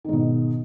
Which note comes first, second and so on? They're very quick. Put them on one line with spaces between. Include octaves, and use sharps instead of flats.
D#3 G#2 B2